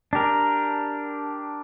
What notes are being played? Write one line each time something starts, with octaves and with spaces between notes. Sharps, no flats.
D4 G4 A#4